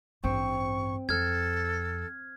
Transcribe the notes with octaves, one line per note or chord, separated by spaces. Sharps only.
A1 G2 C4 C#6
F2 A4 F6 G#6